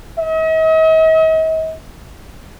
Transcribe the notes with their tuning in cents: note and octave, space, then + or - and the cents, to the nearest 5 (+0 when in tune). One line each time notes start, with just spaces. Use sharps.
D#5 +45